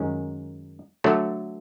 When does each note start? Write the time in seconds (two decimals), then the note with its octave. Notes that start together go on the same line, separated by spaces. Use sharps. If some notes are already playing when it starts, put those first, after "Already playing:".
Already playing: F#2 D#3 G#3 C#4
1.04 D3 F#3 A3